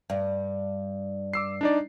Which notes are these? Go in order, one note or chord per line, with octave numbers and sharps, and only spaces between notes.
G2
D6 E6 C7
D4 D#4 D5